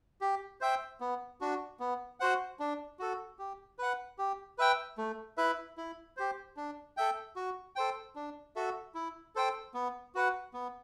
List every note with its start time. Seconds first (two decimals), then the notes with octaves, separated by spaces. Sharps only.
0.21 G4
0.61 C5 E5 G5
1.00 B3
1.41 D4 F#4
1.80 B3
2.20 F#4 C5 F#5
2.60 D4
2.99 F#4 A4
3.39 G4
3.79 B4 F#5
4.19 G4
4.58 B4 E5 G5
4.98 A3
5.37 E4 B4 E5
5.78 E4
6.17 G4 C5
6.57 D4
6.97 A4 E5 G5
7.36 F#4
7.76 A4 C5 G5
8.16 D4
8.56 F#4 A4 E5
8.95 E4
9.35 A4 C5 G5
9.74 B3
10.15 F#4 B4 F#5
10.54 B3